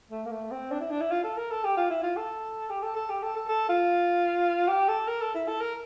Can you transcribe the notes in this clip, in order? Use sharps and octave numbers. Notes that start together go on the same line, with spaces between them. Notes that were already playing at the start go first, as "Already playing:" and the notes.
A3
A#3
A3
C4
D4
E4
D4
E4
F4
A4
A#4
A4
G4
F4
E4
F4
A4
G4
A4
A4
G4
A4
A4
A4
F4
G4
A4
A#4
A4
E4
A4
A#4